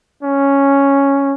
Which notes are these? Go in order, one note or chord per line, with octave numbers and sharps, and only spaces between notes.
C#4